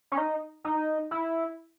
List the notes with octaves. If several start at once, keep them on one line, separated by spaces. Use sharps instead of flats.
C#4
D#4
D#4
E4